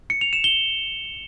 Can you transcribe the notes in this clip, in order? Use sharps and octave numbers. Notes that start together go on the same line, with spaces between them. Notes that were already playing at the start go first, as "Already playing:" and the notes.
C#7
F7
E7
G7